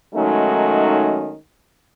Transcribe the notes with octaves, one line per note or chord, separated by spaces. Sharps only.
D#3 F#3 G#3 A3 C#4 D#4